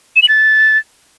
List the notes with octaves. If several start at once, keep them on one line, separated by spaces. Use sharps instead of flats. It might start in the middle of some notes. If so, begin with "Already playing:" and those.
E7
F#7
A6